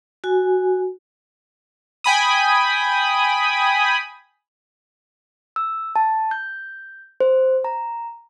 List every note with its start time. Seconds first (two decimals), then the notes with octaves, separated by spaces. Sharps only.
0.24 F#4 G#5
2.04 G5 G#5 B5 D#6
5.56 E6
5.96 A5
6.31 G6
7.20 C5
7.64 A#5